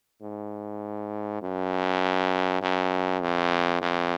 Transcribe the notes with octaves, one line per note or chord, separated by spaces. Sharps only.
G#2
F#2
F#2
F2
F2